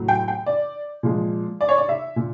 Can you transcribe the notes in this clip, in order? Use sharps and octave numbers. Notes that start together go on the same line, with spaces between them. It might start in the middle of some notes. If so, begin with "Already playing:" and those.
Already playing: A2 F#3
G5
G5
D5
A#2 F3 G#3
D5
C#5
D5
E5
A#2